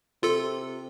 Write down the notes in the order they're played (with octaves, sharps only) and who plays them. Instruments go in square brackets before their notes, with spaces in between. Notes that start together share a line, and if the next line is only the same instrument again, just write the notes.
[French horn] C3 [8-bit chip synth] F4 A4